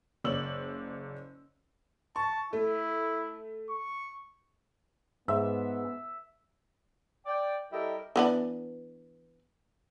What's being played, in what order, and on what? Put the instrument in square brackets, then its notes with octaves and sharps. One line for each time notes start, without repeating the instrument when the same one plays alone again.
[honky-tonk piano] F#1 A#3 C#5 D5 E6 F#7
[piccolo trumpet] A5 [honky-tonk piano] C#6
[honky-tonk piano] A3 [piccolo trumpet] E4
[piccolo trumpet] C#6
[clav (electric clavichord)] G#2 [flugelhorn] B3 [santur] E5
[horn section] D5 G5
G3 E4 G4 A4 A#4 D#5
[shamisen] E3 B3 D4